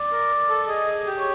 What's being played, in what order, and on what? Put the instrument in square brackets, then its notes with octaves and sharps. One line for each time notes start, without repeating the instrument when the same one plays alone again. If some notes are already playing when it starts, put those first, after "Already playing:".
Already playing: [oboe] D5
[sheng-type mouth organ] A#4
A4
[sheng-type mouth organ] G#4 [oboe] D#5
[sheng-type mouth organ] G4
[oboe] C#5